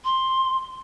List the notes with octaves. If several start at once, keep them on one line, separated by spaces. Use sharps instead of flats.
C6